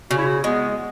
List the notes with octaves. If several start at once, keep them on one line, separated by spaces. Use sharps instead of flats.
C#3 F#4
E4
F#4
G#3 B3